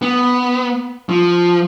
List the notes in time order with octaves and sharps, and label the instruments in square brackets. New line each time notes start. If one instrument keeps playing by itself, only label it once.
[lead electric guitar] B3
F3